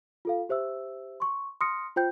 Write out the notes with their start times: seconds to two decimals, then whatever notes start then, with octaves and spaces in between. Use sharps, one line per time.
0.25 F4 A4 F5
0.49 G4 C5 E5 E6
1.20 C6 C#6
1.61 C6 D#6 F6 A#6 C#7
1.96 F4 C5 G5 G6